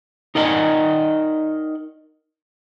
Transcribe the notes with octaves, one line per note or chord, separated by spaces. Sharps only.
D#4 A#4 D5 D#5 F#5 G#5